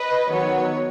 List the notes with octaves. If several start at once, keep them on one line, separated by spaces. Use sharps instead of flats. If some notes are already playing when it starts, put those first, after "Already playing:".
Already playing: B4 D#5
D#3 F#3 B3 C#5